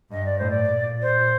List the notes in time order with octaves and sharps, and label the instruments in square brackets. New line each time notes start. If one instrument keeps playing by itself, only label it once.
[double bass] G2 [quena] D#5
[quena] D5
[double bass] A2 [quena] C5
[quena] D5
[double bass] A#2
[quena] C5